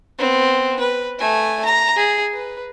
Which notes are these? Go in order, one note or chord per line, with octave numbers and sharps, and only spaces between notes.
B3 C4
B4
A3 G#5
A#5
G#4
B4